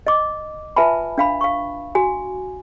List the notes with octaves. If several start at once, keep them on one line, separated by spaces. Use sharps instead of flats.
D#5 D6
F4 B4 E5 G#5 A5 B5
D4 F5 B5
F5 C#6
F#4 G#5